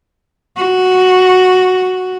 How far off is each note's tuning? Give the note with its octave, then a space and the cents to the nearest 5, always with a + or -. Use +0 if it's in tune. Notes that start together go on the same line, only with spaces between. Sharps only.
F#4 -5